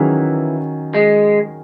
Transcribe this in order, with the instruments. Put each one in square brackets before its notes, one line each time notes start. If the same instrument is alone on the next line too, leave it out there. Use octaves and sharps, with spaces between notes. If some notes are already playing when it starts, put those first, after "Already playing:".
Already playing: [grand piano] D#3 F#3 C#4 G#4 [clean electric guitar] E3
[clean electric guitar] G#3